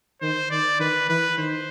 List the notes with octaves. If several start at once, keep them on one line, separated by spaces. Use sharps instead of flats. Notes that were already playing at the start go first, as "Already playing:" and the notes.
D#3 C5
D#3 D5
D#3 B4
E3 B4
D#3 C5